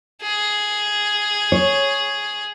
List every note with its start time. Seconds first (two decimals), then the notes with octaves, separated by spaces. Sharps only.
0.21 G#4
1.52 C#5